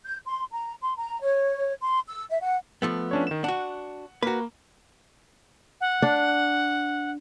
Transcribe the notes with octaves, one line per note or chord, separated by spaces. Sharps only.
G6
C6
A#5
C6
A#5
C#5
C6
E6
E5
F#5
F3 A3 B3
C#4 D4 C#5
D#3 E7
D4 F#4 F#5
A#3 F#4 B4 A#5
F#5
D4